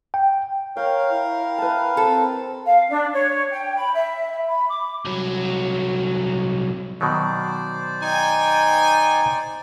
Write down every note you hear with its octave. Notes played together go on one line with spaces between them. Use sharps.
G5
A#4 C#5 F5 G5
E4
B4 A5
C4 A4
F5
D4
C#5
G5
B5
E5
E5
B5
D6
C2 F#3
B2 D#3 F#3 C5 D5
D#4 G5 G#5